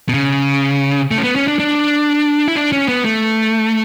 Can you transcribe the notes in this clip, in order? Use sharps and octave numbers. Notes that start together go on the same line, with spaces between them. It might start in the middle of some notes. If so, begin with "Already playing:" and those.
B2
C#3
A3
C#4
B3
C#4
D4
D4
E4
D4
C#4
B3
A3